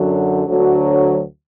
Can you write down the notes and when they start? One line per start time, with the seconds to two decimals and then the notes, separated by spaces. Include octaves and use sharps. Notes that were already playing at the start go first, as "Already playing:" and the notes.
Already playing: F#2 D3 F#3
0.46 D2 D3 F#3